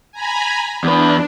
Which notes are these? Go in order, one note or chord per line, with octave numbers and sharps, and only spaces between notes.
G#5 A#5 B5
E2 D4 B4